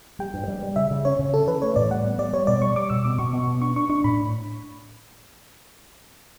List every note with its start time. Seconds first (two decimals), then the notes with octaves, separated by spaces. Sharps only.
0.19 G3 G5
0.34 G2
0.48 G3
0.63 G3
0.76 C#3 E5
0.91 C#3
1.05 C#4 C#5
1.19 C#3
1.34 C#4 A4
1.47 E3 B4
1.62 A3 C#5
1.76 A2 D5
1.91 G3 F#5
2.05 B3
2.18 G3 D5
2.33 G3 C#5
2.47 B2 D5
2.62 G3 C#6
2.76 G3 D6
2.90 B2 E6
3.05 B2 D6
3.18 B2 C#6
3.33 B2
3.47 B2
3.61 D4 C#6
3.76 D4 C#6
3.89 D4 C#6
4.04 A2 B5